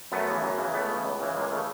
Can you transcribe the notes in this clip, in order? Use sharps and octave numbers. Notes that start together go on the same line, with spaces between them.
F#2 A3 B3
C#3 E3
F#2
C#3 E3
C#2 A3 B3
C#3 E3
C#2
C#3 E3
C#2 G#3 A#3
C#3 E3 A3